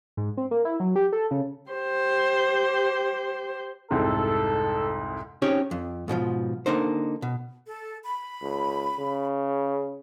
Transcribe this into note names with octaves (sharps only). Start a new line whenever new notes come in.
G#2
C4
A#3
E4
F#3
G4
A4
C#3
G4 C5
C2 F2 G#2 A4
C4 C#4 D#4 G4 G#4 C#5
F2
G#2 B2 E3 F3
D3 A#3 D#4 C5
B2
A4
B5
C#2
C#3